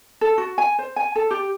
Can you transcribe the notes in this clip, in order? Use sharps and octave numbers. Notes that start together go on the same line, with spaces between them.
A4
F#4
G#5
C5
G#5
A4
G4